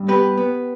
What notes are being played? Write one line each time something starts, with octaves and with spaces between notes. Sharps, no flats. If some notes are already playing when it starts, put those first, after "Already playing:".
Already playing: G2
B3 G4 B4
B3